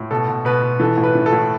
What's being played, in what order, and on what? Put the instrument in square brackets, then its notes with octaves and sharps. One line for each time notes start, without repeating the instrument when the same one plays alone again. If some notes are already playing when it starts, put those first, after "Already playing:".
Already playing: [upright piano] A2
B2 A4
B2
B2 B4
B2
E3 A4
A2
B4
E3
A4
A2